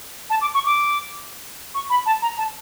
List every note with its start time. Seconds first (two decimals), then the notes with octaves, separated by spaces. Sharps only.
0.30 A5
0.41 D6
0.54 C#6
0.66 D6
1.75 C#6
1.90 B5
2.06 A5
2.22 A#5
2.38 A5